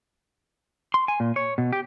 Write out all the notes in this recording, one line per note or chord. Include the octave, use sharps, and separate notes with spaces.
C6
G#5
A#2
C#5
B2
G4